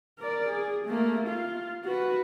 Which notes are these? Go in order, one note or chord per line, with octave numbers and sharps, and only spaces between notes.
A#4 D5
G#4
A3 A#3
F4
F#4 B4